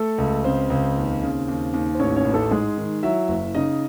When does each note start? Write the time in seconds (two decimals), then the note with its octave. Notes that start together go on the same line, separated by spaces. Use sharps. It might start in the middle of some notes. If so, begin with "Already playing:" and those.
Already playing: A3 A4
0.18 C#2
0.44 C#3 C4 C5
0.70 C#2
0.96 D#2
1.22 C#3
1.48 D#2
1.73 D#2
1.94 C5
1.99 A1 C#4 C#5
2.16 C#4 C#5
2.25 A1
2.34 A3 A4
2.51 G#2 G#3 G#4
2.77 D#3
3.03 F#3 E4 E5
3.28 F#1
3.55 C#3 D#4 D#5